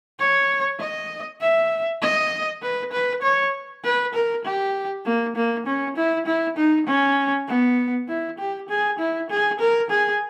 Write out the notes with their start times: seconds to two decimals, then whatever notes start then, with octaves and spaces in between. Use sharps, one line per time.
0.20 C#5
0.80 D#5
1.41 E5
2.02 D#5
2.62 B4
2.92 B4
3.22 C#5
3.84 B4
4.14 A#4
4.45 G4
5.05 A#3
5.36 A#3
5.66 C#4
5.96 E4
6.26 E4
6.57 D#4
6.87 C#4
7.48 B3
8.08 E4
8.38 G4
8.69 G#4
8.99 E4
9.30 G#4
9.60 A#4
9.90 G#4